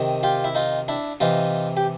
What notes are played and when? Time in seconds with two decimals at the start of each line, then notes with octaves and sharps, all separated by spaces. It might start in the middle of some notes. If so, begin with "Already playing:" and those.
Already playing: C3 D#3
0.23 F4 G4
0.44 E4
0.55 D#4 F4
0.88 D4 E4
1.20 C3 E3 D#4 F4
1.77 G4